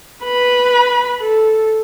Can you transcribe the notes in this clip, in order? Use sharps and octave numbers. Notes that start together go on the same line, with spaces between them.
B4 B5
A4